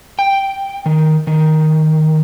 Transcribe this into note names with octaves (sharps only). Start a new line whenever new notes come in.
G5
D#3
D#3